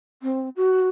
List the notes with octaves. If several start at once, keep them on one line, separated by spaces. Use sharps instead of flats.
C4
F#4